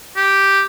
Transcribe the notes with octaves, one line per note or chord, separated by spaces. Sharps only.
G4